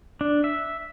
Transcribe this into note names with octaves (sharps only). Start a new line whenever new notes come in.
D4
E5